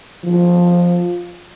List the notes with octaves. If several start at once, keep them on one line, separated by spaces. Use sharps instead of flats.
F3